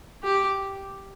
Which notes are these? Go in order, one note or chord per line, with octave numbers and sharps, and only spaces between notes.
G4